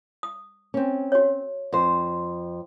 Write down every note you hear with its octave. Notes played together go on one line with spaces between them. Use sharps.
D#6
C4 C#4
F#4 C#5
F2 C5